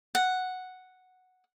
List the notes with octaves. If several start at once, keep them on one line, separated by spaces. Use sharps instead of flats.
F#5